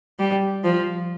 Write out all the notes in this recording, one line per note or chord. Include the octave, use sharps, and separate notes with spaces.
G3
F3